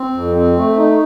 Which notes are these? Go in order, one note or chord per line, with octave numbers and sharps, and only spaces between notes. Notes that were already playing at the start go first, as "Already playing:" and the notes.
Already playing: C4
F2
C4
A3
D#4